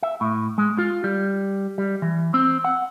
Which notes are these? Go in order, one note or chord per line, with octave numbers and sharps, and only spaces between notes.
E5
A2
G#3
F4
G3
G3
E3
C4
F#5